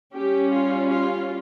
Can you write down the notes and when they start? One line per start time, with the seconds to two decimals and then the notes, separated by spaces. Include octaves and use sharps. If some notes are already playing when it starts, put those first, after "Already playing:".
0.14 G3 C#4 G4
0.52 F4
0.91 F4